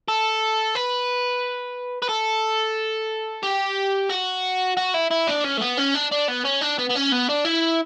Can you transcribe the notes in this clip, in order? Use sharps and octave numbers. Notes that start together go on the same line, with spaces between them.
A4
B4
B4
A4
G4
F#4
F#4
E4
E4
D4
C#4
A3
B3
C#4
D4
D4
B3
C#4
D4
B3
B3
C#4
B3
D4
E4